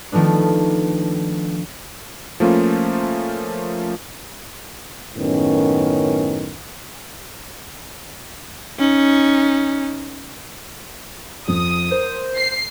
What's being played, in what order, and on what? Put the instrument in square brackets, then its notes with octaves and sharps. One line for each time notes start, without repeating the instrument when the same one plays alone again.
[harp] D#3 F3 A3 B3 D4
[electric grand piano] F3 A3 A#3 C#4 F4
[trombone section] F#2 A2 D#3 B3 C#4
[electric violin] C#4 D#4
[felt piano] F2 [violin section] D#6
[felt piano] A#4 [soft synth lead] C5
[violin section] C7